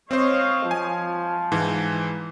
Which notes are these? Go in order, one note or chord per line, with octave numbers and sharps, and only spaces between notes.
C4 C5 C#5 D#5 F5
F3 G#5
G#2 E3